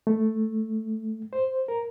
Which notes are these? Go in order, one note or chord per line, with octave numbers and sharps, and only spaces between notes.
A3
C5
A#4